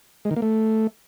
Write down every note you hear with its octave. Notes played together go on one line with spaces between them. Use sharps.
G#3
D#3
A#3
A3